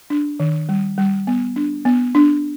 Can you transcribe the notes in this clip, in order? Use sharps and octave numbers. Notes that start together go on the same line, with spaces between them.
D4
D#3
G3
G3
B3
D4
B3
D4